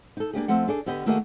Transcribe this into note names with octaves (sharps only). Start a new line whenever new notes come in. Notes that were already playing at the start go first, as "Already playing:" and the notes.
D#4 A4
A#3 D4 G4 G#4
F3 A3 C4 F#5
D4 D#4 G#4 A4 D5
D3 B3 G4 D#5
D#3 A3 A#3 F#4 G#4 D#5